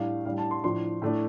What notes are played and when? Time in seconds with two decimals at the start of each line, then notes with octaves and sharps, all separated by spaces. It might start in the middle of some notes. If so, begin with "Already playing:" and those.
Already playing: A2 G3 D4 F5
0.25 A2 G3 D4 F5
0.38 A5
0.51 C6
0.64 A2 F3 D4 C6
1.02 A2 A3 D4